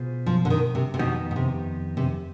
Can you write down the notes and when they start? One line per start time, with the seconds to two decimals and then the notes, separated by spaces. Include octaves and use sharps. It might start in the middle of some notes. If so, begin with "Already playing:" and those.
Already playing: B2 B3 F4 G#4 C5
0.26 F3
0.45 D3
0.50 D#3
0.75 C3
0.94 C3
0.99 F2 B2 D#3 B3 D#4 G4
1.31 B2
1.36 C3
1.97 C3